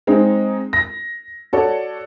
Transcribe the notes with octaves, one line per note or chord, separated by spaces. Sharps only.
G#3 C4 D#4
A#6
F#4 A4 C#5 D5